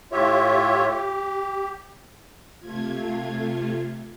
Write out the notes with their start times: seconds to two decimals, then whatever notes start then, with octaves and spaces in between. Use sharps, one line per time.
0.12 A2 F4 G4 C#5 E5
0.87 G4
2.60 C3 A3 F4 G#6